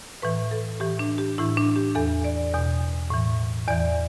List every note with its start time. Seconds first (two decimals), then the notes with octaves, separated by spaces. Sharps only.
0.22 A2 E3 B4
0.51 A4
0.80 A2 E3 G4
0.99 D4
1.18 G4
1.38 A2 E3 E4
1.57 D4
1.76 G4
1.95 E2 E3 A4
2.24 D5
2.54 E2 B2
3.10 A2 E3
3.67 E2 E3 D5